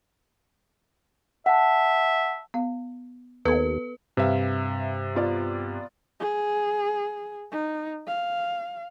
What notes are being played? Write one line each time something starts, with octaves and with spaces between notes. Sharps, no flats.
E5 F#5 A5
B3 F5
D#2 B3 A4 B4 G#6
G2 C3 B4 E5 F5
B3 F4 D5
G#4
D#4
F5